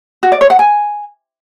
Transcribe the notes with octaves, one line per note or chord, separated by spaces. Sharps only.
F#4
D5
C#5
F#5
G#5